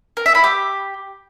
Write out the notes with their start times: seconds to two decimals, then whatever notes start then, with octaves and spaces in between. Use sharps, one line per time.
0.17 A#4
0.26 E5
0.35 B5
0.44 G4